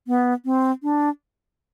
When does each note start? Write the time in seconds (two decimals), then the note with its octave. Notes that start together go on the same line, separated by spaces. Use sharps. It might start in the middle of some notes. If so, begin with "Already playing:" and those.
0.07 B3
0.45 C4
0.83 D4